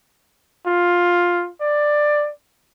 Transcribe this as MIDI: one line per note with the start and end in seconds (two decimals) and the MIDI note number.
0.67 1.48 65
1.61 2.30 74